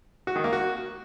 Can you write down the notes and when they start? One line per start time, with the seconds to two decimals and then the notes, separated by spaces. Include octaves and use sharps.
0.27 F#4
0.36 D#3
0.44 A#3
0.53 F#4